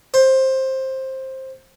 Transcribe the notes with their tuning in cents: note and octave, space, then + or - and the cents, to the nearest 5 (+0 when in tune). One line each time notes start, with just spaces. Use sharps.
C5 +15